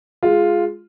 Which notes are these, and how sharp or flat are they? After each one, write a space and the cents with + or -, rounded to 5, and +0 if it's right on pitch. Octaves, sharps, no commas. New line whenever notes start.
G#3 +0 F4 +0